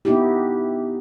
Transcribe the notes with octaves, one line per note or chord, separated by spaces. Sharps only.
B3 D#4 E4 G4